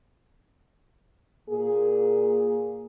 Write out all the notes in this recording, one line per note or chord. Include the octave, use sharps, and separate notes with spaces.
A#2 A#3 G#4